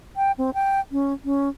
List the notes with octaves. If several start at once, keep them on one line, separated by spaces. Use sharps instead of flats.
G5
C4
G5
C#4
C#4